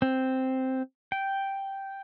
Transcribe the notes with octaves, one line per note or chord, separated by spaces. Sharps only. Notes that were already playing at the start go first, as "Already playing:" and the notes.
C4
G5